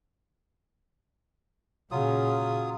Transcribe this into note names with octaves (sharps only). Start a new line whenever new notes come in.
A#2 C#3 F#3 F4 D#6